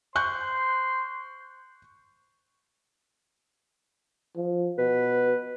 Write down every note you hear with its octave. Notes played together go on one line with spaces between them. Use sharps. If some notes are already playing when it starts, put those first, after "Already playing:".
C5 C6 C#6 F#6 G6
F3
B2 B4